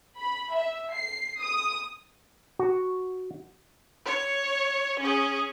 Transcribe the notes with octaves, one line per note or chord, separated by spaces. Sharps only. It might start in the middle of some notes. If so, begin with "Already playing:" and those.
B5
E5
C7
D#6
F#4
C#5
C#4 G#4